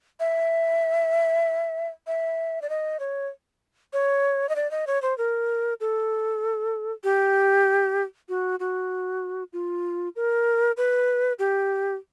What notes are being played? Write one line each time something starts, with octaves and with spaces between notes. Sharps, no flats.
E5
E5
D5
D#5
C#5
C#5
D#5
D5
D#5
C#5
C5
A#4
A4
G4
F#4
F#4
F4
A#4
B4
G4